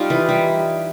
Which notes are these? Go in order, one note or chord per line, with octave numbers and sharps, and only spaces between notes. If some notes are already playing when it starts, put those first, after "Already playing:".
Already playing: G3 D#4 F4
E3
G3